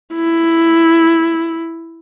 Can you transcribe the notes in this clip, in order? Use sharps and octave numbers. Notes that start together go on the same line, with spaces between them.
E4